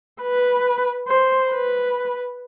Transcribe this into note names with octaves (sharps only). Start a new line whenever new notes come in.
B4
C5
B4